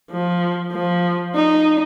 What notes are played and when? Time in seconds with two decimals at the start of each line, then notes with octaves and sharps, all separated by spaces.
0.11 F3
0.73 F3
1.35 D#4